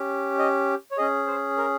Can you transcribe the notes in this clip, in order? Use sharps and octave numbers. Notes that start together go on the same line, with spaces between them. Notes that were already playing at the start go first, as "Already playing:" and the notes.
Already playing: C#4 G4
D#5
C#5
C#4 G#4 D#5
C5
A#4